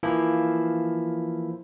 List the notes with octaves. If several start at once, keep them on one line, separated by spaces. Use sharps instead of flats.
E3 F3 A#3 E4